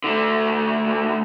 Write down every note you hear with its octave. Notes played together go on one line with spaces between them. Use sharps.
D3 A3